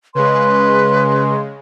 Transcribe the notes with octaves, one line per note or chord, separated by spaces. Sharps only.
C#3 G#3 B4 C6